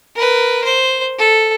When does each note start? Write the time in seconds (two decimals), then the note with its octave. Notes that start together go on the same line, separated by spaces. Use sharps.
0.15 A#4 B4
0.65 C5
1.19 A4